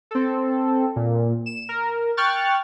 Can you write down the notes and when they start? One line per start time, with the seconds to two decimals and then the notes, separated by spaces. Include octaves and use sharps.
0.11 C4 A4
0.96 A#2
1.46 E7
1.69 A#4
2.17 G5 C#6 F6 F#6 A6